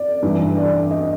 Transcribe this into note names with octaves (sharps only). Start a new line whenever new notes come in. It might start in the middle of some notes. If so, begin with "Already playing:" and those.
Already playing: D5
G2 E3
D5
D#5